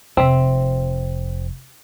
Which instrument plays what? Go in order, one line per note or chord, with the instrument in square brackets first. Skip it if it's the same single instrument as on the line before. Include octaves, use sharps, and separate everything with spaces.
[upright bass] F1 [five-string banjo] C4 E5